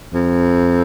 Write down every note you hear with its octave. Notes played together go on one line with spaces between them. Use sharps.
F2